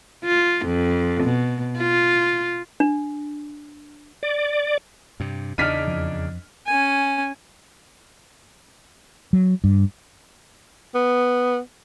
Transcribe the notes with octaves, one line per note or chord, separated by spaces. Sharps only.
F4
F2
B2
F4
D4
D5
G2 C3
E2 C#3 D4 D#4 F6 B6 D#7
F2 F3
C#4 G#5
F#3
G2
B3